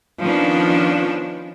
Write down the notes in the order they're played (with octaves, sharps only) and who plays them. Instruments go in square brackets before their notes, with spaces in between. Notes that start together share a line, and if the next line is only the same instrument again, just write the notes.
[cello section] D#3 F3 B3 C#4 D4